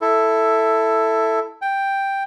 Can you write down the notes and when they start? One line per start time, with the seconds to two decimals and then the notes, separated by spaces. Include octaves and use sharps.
0.01 E4 A4
1.62 G5